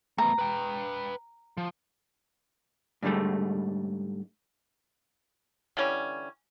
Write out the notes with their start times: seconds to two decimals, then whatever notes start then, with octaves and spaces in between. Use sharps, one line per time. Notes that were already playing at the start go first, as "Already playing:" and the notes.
0.18 A3 B3 A#5
0.39 B4 G5
1.57 F3
3.03 G#2 D3 D#3 G3 A3
5.77 D3 E3 G3 C#4